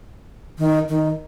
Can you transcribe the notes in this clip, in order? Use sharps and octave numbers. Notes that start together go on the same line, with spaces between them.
D#3
D#3